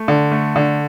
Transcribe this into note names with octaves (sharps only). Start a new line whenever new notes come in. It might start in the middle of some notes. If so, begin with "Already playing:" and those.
Already playing: A3
D3
A3
D3